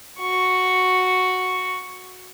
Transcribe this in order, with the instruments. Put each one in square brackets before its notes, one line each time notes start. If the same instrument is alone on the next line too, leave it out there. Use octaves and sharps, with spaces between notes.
[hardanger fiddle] F#4 C#6